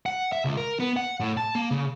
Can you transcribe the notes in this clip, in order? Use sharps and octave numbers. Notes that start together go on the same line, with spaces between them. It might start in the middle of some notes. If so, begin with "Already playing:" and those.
F#5
E5
C#2
A#4
B3
F#5
A2
A5
A#3
C#3